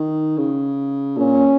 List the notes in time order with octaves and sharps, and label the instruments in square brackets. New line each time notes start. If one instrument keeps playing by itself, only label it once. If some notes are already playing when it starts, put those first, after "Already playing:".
Already playing: [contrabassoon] D#3
C#3
[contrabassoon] A#2 [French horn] C#4